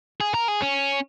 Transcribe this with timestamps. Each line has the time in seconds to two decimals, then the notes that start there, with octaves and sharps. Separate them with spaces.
0.20 G#4
0.34 A#4
0.48 G#4
0.62 C#4